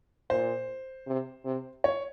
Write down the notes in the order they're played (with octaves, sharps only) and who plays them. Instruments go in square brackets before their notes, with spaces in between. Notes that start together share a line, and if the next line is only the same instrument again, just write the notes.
[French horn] A#2 [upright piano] C5
[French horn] C3
C3
[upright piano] C#5